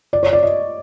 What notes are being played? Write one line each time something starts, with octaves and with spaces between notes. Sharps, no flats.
D5
C#5
D5
D#5